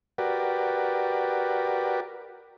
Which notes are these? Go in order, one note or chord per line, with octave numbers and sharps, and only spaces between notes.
F#4 G4 A#4 B4 D5